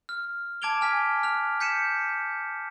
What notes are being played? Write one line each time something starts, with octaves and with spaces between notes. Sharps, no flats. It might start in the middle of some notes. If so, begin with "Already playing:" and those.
F6
A5 D6 G#6 D7 F7 G7
G#5 F6 B6
F6 F#6 F7
G6 B6 C#7 D#7 E7